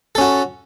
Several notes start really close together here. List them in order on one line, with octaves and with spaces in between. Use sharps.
A4 C#4 F#4